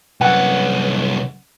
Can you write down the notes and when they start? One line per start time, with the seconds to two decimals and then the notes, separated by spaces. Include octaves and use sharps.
0.21 C2 F#2 B4 F#5